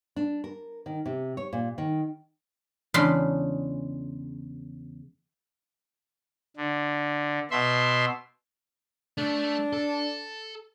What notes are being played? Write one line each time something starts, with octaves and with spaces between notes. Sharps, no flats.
D4
A#4
D#3
C3
C#5
A#2
D#3
E2 C#3 G#3 D4 B5 C6
D3
B2 E5 C6
A3 D4
A4